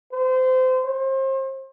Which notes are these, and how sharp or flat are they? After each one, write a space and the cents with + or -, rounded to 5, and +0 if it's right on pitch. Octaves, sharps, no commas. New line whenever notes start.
C5 -25
C5 +35